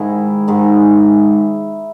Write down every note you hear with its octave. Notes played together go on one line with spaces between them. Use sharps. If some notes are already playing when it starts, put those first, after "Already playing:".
Already playing: G#2 D#3 G#3 E4
G#2 D#3 G#3